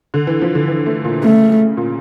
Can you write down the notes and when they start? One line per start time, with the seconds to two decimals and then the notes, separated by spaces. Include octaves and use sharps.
0.14 D3
0.27 E3
0.42 F3
0.55 D3
0.68 E3
0.86 A3
1.04 A#2
1.22 C#3 A3
1.77 A#2